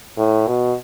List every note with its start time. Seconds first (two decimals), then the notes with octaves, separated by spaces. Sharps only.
0.18 A2
0.48 B2